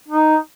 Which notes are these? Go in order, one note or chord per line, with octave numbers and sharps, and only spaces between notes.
D#4